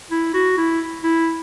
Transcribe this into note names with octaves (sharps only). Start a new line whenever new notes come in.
E4
F#4
E4
E4